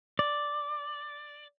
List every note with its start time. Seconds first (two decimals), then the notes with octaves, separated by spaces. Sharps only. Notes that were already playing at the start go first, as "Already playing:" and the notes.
0.19 D5